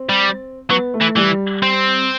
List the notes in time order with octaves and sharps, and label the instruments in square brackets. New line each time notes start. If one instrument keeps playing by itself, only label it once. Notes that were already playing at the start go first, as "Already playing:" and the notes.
Already playing: [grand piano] C4
[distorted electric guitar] G3
[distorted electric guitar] F#3 [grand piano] B3
[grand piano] A3
[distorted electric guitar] E3
[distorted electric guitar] E3 [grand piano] G3
[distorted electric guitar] C4